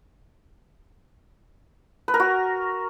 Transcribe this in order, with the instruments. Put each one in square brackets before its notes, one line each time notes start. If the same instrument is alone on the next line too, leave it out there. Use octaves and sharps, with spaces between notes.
[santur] B4
A#4
F#4